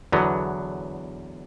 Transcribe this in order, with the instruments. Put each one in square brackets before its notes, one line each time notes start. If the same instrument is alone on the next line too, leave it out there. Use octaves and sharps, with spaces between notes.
[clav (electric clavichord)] E2 D3 F#3 B3